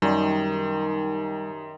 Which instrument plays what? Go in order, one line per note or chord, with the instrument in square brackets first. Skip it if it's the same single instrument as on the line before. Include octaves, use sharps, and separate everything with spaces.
[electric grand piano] F#2 [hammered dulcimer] D#3 [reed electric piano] G3 [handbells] D#4 G4 G5